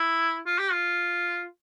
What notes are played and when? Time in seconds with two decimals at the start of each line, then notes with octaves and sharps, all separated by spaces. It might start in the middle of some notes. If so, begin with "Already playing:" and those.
Already playing: E4
0.46 F4
0.59 G4
0.72 F4